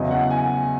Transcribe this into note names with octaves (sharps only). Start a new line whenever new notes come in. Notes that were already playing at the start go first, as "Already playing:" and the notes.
Already playing: E2 C#3 F#3 D#5
F#5
G#5